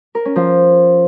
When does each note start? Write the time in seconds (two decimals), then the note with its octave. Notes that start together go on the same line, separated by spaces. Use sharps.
0.15 A#4
0.25 C#4
0.36 F3